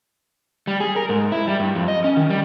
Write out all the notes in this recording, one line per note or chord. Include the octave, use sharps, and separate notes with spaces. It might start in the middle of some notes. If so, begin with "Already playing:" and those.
G3
G#4
A#4
G#2
E4
G3
G2
F2
D#5
C#4
D#3
G3